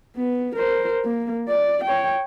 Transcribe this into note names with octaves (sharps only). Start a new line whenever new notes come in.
B3
A#4 C5
A#3
D5
C#5 G5